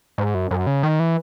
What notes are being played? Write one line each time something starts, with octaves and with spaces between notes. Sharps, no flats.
G#2
F#2
F#2
C#3
D#3
E3